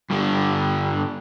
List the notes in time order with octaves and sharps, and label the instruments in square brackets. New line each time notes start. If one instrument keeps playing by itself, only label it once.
[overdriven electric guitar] G2 D3